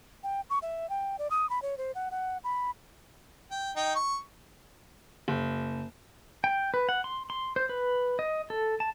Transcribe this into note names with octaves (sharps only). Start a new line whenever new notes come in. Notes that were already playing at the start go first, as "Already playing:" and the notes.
G5
C#6
E5
G5
D5
D#6
B5
C#5
C5
F#5
F#5
B5
G5
D#4 G5
C#6
F#1
G5
B4
F#5
C6
C6
C5
B4
D#5
A4
A5